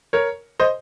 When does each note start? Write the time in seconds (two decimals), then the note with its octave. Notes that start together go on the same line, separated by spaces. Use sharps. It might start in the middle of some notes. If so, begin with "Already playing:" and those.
0.13 A#4 C#5
0.60 C5 D#5